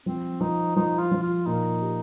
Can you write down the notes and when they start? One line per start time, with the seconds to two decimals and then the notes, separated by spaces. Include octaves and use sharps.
0.06 F3 C4
0.41 F3 D#4
0.76 F3 D#4
0.99 F4
1.11 F3
1.23 F4
1.46 A#2 D#4
1.82 G4